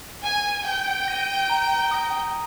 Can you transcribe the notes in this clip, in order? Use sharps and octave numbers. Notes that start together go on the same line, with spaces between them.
G#5 G#6 D#7
G5 G6
A#6 D#7 G7
A#5
D#6 A#6